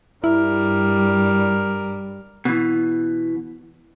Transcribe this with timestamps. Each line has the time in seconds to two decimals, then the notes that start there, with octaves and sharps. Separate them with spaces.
0.24 G2 G3 E4 A#4
2.45 B2 E3